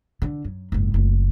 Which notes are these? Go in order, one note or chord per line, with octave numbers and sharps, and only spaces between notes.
D3
F#2
F#1 G#2
F#1 A3